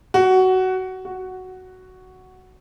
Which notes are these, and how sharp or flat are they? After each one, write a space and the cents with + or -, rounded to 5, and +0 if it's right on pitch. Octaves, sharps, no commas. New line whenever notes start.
F#4 +15
F#4 +5